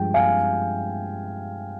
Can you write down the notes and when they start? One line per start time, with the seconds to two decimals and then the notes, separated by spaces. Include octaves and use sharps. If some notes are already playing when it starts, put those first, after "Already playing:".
Already playing: G2 F3 G#3 G5
0.14 F5 G#5